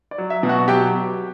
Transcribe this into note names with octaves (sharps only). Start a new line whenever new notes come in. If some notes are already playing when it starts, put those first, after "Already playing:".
D5
F#3
E5
B2
F#4 F#5
F#3 G4 G5